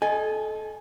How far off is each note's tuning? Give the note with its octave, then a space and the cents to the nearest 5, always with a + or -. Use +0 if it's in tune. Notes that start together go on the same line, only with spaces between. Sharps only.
A4 -30 D#5 +0 G#5 +0